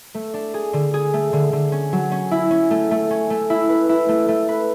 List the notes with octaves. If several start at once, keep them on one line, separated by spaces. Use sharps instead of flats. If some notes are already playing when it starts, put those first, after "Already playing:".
A3
D4
G#4
D3
G#4
A3
D3
D3
C#4
F#3
C#4
E4
C#4
A3
A3
C#4
A3
E4
B4
E4
A3
A3
B4